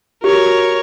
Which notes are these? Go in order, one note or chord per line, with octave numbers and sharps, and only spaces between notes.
F#4 G4 A#4 C#5